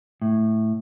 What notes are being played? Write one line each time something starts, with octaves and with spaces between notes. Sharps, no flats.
A2